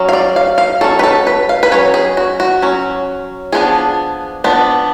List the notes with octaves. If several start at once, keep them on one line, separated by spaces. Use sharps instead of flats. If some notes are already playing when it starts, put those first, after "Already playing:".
Already playing: F#3 C#4
F5
D5
F5
F5
F#3 C#4 A4
B4
A4
B4
F5
B4
F#3 C#4 C#5
G#4
F#4
F#4
F#3 C#4
F3 B3 D4 G#4
F3 B3 D4